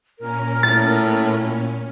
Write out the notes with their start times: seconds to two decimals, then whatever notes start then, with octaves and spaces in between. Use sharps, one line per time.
0.19 A#2 C#4 A#4
0.63 A2 A6